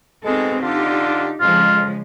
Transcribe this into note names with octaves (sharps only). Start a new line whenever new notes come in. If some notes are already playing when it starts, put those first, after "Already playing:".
B2 G#3 C4 D#4 A4
D3 D4 D#4 F4 G4
F2 C#3 F3 G#3 F4